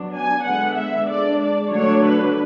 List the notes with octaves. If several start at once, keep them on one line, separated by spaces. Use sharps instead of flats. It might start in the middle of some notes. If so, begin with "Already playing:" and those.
Already playing: F#3 B3 D4
G#5
D3 G#3 B3 F#5
E5
G#3 D4 D5
D5
D3 F#3 A3 D4 C#5
B4